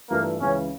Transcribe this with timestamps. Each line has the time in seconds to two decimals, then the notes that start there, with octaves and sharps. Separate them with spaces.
0.10 G2 E3 A3 A#3 D4 F4
0.40 C#2 C#3 E3 C#4